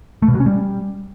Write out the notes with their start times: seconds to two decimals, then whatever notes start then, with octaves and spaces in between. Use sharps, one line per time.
0.22 A3
0.28 B2
0.34 F#3
0.40 C#4
0.46 G3